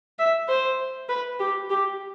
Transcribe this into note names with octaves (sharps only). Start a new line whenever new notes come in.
E5
C5
B4
G4
G4